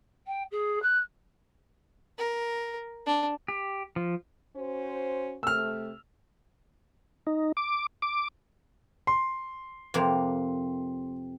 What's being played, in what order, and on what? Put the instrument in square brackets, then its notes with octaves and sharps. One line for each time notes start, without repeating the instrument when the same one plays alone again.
[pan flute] G5
G#4
F#6
[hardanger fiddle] A#4
D4
[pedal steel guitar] G4
F3
[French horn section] C#4 F#4 C5
[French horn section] C3 A3 [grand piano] E6 F6
[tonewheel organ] D#4
D6
D6
[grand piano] C6
[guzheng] F2 C3 A#3